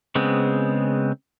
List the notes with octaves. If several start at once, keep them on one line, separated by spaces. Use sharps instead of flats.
C#3 G#3 B3 C4